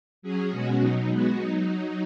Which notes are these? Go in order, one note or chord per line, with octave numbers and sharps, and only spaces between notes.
F#3 C#4 G#4
B2 G#3 C#4 F#4
B2 F#3 D#4
G#3 B3 F#4
F#3 D#4